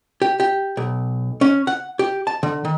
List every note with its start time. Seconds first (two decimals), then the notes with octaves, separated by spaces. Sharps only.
0.22 G4
0.40 G4
0.77 B1
1.41 C#4
1.67 F#5
1.99 G4
2.27 A5
2.43 D3
2.65 D#3